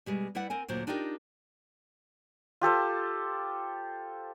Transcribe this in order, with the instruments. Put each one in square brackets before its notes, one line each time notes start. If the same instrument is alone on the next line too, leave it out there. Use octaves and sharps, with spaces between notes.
[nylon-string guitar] B2 G3 G#3
G3 E4 B4 D5 F#5
C4 A#4 G#5
D2 A#2 F#3 C5
D4 D#4 F4 G4 A#4
[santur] F4 G4 A4 C5